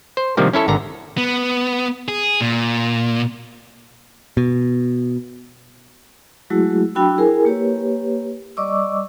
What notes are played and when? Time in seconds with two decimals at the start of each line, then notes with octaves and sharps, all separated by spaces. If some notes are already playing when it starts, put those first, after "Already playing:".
0.17 C5
0.37 C3 D#3 F3 G3 A#3
0.53 C#4 E4 A4 C#5
0.68 G#1 D3 A#5
1.18 B3
2.08 G#4
2.41 A#2
4.37 B2
6.50 F#3 G#3 A3 E4 F#4 G#4
6.95 F#3 D4 F#4 G5 B5 E6
7.18 E4 G#4 A#4 G#5
7.45 A#3 G4 B4 C#5
8.57 G3 D5 D#5 C#6 D6 E6